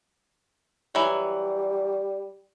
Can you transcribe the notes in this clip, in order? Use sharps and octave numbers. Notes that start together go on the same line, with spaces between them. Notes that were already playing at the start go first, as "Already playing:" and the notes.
E3 F#3 G3